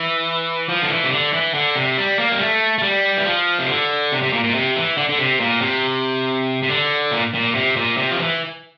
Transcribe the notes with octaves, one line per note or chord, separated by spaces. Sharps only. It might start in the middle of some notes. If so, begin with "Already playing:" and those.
Already playing: E3
F3
D3
E3
C3
D3
E3
D3
C3
G3
A#3
G3
A3
A3
G3
E3
F3
C3
D3
C3
C3
A#2
A#2
C3
E3
D3
D3
C3
A#2
C3
C3
D3
A#2
A#2
C3
A#2
C3
F3
E3